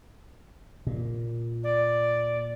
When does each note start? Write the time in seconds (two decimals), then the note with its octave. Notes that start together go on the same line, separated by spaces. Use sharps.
0.87 A#2
1.63 D5